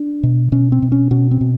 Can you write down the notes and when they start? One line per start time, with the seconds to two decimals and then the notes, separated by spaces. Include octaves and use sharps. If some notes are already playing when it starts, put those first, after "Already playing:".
Already playing: D4
0.23 B2
0.52 B2 C#4
0.72 C4
0.82 B2
0.92 C#4
1.11 B2 C#4
1.31 C4
1.41 B2